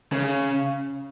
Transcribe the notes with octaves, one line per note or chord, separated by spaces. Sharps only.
C#3